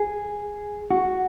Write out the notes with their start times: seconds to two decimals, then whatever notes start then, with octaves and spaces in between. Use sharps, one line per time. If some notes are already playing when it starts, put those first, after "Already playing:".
Already playing: G#4
0.91 F#4